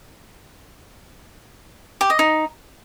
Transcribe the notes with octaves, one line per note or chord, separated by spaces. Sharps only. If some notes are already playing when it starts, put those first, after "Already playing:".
G4
D#5
D#4